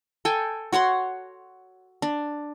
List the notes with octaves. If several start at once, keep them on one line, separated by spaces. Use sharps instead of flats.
A4 G5 G#5
F#4 C#5 F#5 C6
D4